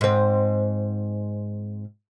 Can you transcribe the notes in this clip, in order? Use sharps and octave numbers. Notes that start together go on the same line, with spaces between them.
G#2 C4